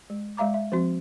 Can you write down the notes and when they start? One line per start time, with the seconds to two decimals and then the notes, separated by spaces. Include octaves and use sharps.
0.10 G#3
0.37 G#3 E5 F5 A#5 D6
0.54 E5
0.72 F3 C4 F#4